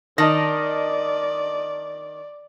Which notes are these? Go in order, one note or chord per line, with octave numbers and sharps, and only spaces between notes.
D#3 D5 D#5 A5 A#6